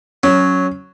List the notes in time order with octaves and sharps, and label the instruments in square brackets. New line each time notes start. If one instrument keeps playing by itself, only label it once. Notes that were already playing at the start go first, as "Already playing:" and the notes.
[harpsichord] F#3 [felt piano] C#4